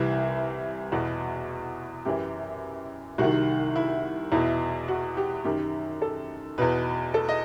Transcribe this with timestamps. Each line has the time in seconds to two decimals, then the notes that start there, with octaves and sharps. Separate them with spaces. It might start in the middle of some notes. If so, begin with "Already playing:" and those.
Already playing: C2 C3 E3 E4
0.92 E2 B2 F#4
2.05 F#2 E3 G4
3.18 C2 C3 D#3 F#4
3.76 E4
4.32 E2 B2 E4
4.88 F#4
5.17 G4
5.45 F#2 D#3 G4
6.02 A4
6.58 E2 B2 B4
7.14 A4
7.29 D#5